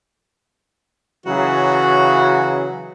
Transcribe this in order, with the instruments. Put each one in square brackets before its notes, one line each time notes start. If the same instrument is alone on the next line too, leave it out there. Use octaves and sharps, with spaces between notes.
[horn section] C#3 E3 F#3 [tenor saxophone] F#4